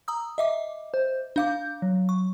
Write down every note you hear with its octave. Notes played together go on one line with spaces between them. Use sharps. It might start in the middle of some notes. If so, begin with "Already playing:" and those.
A#5 D#6 E6
D#5 E5 D6
C5
D4 F5 D6 G6
F#3
C#6